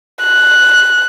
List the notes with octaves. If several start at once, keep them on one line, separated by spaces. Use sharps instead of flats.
F#6